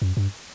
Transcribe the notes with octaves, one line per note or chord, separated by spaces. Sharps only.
F#2
G2